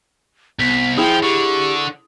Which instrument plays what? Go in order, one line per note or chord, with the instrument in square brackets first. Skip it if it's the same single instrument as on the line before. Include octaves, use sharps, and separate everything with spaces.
[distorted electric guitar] C2 [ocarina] B3 [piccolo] B6
[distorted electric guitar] F3 [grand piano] E4 G#4 [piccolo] G5
[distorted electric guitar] D3 [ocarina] G4 [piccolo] C#6